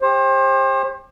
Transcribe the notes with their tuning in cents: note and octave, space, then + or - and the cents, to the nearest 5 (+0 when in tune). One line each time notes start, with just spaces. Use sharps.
G4 +25 C5 +35